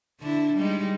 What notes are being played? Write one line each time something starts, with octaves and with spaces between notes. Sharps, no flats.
D3 D4 E4
G3 G#3 D#4